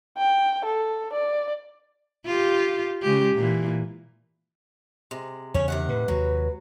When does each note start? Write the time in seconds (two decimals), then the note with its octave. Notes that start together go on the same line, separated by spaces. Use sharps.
0.17 G5
0.65 A4
1.13 D5
2.26 F4 G4
3.02 C#3 G#3 G4
3.36 A#2 E3
5.11 C3 G#3
5.54 E2 C#3 C#4 C#5
5.68 C3 D#3 F#5
5.89 A2 B4
6.08 D#2 C3 F#3 G#3